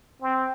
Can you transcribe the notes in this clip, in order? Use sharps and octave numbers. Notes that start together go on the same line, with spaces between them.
C4